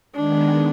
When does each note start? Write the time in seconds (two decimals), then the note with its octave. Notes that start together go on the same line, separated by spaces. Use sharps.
0.16 D#3 G#3 B3 D4